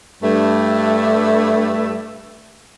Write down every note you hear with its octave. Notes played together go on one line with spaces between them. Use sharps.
G2 A3